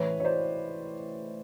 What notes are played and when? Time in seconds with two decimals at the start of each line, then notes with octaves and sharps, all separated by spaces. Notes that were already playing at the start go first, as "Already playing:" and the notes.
Already playing: A1 A2 E3 B4 C#5
0.20 C#5
0.25 C5 D5